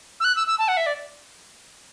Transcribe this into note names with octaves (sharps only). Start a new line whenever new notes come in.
E6
F#6
E6
E6
A5
F#5
E5
D5